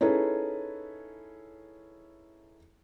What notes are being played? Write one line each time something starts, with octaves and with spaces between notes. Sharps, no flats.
C#4 D#4 E4 G#4 A4 B4